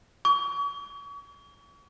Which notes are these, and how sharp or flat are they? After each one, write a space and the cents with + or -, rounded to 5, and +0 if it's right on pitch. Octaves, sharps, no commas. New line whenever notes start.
C#6 +40